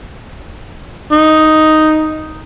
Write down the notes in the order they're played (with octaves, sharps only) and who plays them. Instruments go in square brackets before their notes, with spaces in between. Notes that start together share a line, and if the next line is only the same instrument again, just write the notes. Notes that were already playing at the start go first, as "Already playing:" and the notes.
[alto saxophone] D#4